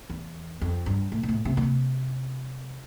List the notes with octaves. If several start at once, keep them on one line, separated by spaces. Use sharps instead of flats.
E2
F2
G2
A2
A#2
A2
C3
A#2
C3